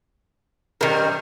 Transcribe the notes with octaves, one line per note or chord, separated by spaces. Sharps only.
F#2 C3 D#3 G3 A#4